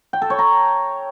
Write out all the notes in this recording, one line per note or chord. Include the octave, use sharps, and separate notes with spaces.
G5
A4
C#5
A#5